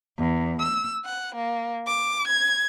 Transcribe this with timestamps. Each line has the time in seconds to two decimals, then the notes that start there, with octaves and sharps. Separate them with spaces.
0.17 E2
0.61 E6
1.04 F#5
1.33 A#3
1.86 D6
2.26 G#6